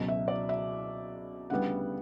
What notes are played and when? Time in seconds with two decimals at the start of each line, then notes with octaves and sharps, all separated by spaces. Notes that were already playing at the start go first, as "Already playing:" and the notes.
Already playing: C#2 B2 F#3
0.08 E5
0.28 D5
0.49 E5
1.50 D2 C#3 G3 B3 F#5